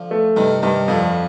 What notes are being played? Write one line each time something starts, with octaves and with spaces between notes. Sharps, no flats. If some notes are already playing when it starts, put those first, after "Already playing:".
Already playing: D3 F3
A3
G2 C3 D#3
G2 C3 D#3
F2 D3 F3